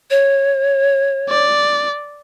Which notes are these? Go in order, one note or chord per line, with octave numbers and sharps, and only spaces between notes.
C#5
D5